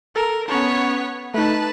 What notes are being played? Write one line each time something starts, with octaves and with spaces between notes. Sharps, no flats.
A4 A#4
B3 C#4 C#5 A5
A3 D#4 B4 A5